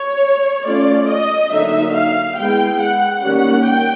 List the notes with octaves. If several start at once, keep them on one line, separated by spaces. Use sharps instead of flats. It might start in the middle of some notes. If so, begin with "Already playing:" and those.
Already playing: C#5
A3 C#4 F4 D5
D#5
D3 F#3 A#3 D#4 E5
F5
G#3 B3 E4 G5
F#5
D#3 G3 A#3 C#4 F#5
G5